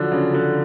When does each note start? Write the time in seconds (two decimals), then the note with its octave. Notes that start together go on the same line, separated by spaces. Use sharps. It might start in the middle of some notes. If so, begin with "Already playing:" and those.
Already playing: D3 F3 F#3
0.12 C#3
0.34 D3